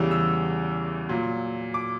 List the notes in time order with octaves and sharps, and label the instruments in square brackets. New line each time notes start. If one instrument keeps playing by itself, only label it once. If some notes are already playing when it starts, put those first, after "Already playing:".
Already playing: [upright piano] E2 C#3 E3 G3 E6
E6
A#2 F#3
D6